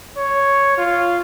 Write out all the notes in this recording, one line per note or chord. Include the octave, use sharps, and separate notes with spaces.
C#5
F4